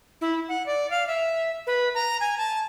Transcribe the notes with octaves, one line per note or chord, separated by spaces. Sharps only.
E4
F#5
D5
F5
E5
B4
A#5
G#5
A5